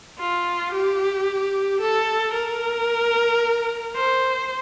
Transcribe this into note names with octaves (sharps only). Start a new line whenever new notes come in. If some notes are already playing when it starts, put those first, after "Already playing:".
F4
G4
A4
A#4
C5